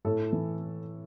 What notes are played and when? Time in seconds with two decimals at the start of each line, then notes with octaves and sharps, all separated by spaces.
0.05 A2 A4
0.33 E3